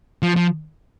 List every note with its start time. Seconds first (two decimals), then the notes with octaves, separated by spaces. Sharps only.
0.23 F3
0.36 F3